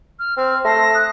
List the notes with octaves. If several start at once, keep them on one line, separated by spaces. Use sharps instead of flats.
F6
C4 F6
A3 A5 C6 A#6
D#6 F#6